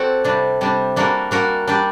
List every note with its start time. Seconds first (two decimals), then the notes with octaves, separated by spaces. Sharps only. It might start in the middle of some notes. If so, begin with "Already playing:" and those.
Already playing: C4 F#4 A4 D5
0.24 C3 G3 D4
0.61 C3 G3 D4
0.96 G3 A#3 D4 F#4 A#4
1.31 G3 A#3 D4 F#4 A#4
1.67 G3 D4 G4 D5